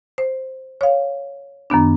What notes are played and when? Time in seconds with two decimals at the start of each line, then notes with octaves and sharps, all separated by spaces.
0.18 C5
0.81 C#5 F5
1.70 F#2 D#3 B3 D4